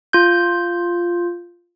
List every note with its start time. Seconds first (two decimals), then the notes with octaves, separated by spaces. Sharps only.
0.13 F4 G6